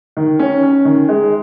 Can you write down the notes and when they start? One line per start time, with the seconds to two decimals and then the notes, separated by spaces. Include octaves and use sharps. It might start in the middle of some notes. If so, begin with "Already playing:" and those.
0.17 D#3
0.39 C#4
0.63 C#4
0.85 D#3
1.09 G#3